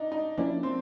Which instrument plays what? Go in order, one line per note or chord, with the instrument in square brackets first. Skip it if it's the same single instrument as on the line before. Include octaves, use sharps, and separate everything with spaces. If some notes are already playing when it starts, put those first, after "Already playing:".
Already playing: [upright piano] D4 D#4
D#4
[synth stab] F3 A#3 C#4 E4 [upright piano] D4
[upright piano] C4